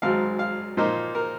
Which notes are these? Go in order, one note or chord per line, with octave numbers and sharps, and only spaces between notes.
G#1 G#2 F#3 F5
F5
A#2 F3 A#3 D#4 C5
A#4